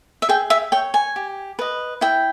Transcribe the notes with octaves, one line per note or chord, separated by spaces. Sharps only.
E5
G#4 G5
E5
C#5 G5
G#5
G4
B4 D#5
E4 G5